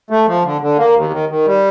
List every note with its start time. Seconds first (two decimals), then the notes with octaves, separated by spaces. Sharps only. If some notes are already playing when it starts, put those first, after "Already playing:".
0.10 A3
0.27 F3
0.44 D3
0.61 D3
0.78 A#3
0.95 D#2
1.12 D#3
1.29 D#3
1.46 G3